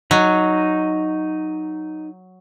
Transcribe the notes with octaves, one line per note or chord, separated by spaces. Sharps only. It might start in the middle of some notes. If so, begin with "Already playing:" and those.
F#3 D#4